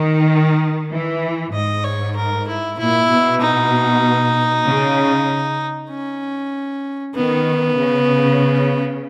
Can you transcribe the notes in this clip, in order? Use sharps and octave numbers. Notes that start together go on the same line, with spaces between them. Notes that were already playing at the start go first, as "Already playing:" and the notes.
Already playing: D#3
E3
G#2 D#5
C#5
A#4
E4
A#2 E4
B2
D#4
C#3
C#4
D#3 B3
C#3